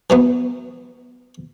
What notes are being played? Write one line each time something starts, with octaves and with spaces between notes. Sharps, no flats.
E3 F#3 B3